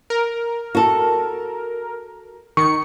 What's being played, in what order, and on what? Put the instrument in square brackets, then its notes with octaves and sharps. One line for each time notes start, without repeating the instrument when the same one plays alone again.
[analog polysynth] A#4
[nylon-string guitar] F#4 A4
[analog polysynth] D#3 C#7 [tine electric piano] C#6